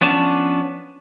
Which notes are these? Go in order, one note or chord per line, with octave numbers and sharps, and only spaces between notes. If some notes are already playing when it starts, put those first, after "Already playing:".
F3 B3 C#4 D4 A5